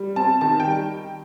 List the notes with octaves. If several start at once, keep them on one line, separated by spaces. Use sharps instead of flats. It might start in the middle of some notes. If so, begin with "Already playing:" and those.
Already playing: G3
C4 A5
D#3 A5
G5
G3